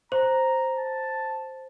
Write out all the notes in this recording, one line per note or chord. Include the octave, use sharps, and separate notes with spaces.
C5 A#5
A5